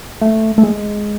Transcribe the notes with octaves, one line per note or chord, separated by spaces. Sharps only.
A3
A3
G#3